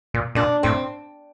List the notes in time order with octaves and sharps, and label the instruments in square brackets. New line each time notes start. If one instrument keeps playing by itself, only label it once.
[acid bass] A#2
[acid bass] A#2 [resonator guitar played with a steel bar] D4
[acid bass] A2 [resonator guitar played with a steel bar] C4